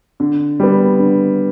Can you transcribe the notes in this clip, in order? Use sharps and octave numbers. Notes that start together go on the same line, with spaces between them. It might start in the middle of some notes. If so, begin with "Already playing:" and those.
D3
G3 B3
D3